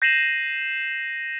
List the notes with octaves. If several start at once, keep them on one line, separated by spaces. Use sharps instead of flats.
G6 A#6 C7 D#7 E7 F#7